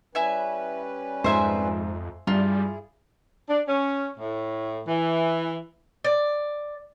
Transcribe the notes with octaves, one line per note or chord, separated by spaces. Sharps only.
G3 C#4 E4 B4 E5 G#5
F2 G#2 C5 E5 G#5
G2 G3 E4 F4 G#4
D4
C#4
A2
E3
D5